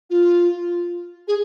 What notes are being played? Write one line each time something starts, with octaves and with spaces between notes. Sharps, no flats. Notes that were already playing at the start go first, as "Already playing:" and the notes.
F4
G#4